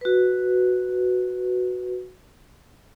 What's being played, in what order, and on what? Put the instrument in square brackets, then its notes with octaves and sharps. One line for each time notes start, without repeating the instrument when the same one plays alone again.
[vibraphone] F#4 B4